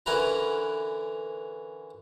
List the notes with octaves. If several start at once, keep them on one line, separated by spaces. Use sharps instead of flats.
D3 E3 C#4 A#4 B4 A#5